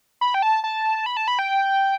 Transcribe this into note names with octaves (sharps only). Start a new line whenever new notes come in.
B5
G5
A5
A5
B5
A5
B5
G5